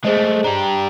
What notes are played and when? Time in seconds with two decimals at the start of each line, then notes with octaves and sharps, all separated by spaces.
0.05 G#3 A3 G#4 C5 D#5
0.44 D4 G4 A#5